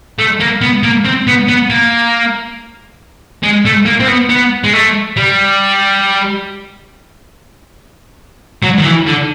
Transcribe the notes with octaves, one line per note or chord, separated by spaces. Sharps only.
A3
A#3
B3
A#3
C4
B3
B3
A#3
G#3
A3
A#3
C4
B3
B3
G#3
A3
G3
F#3
D#3
E3
D3